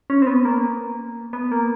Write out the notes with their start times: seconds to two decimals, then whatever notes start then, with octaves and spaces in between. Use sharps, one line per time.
0.10 C#4
0.22 C4
0.27 B3
0.45 A#3
1.33 B3
1.52 A#3